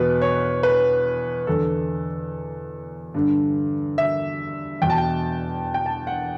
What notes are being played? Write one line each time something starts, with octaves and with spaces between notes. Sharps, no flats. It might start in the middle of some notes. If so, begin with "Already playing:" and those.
Already playing: E2 B2 B4
C#5
B4
E2 D3 A4
G2 D3
E5
E2 B2 G5 A5
G5
G5
A5
F#5